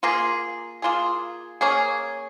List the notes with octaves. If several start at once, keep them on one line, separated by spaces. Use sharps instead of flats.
A#3 F4 G#4
A#3 F4 G#4
A#3 C#4 G#4